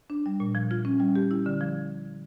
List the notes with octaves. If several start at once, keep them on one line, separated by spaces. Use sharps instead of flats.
D4
G3
A#2
F3
F4
C#4
G3
G4
E4
D3
F3